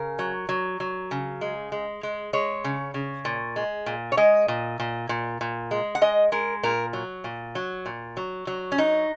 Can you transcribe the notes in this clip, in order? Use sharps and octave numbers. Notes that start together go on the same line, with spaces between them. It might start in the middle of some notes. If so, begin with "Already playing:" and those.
Already playing: C#3 A#4
F#3
F#3
F#3
C#3
G#3
G#3
G#3
G#3 C#5
C#3
C#3
A#2
G#3
A#2
C#5
G#3 D#5
A#2
A#2
A#2
A#2
G#3
F#5
G#3 D#5
G#3 A#4
A#2 A#4
F#3
A#2
F#3
A#2
F#3
F#3
C#4
F#3 D#4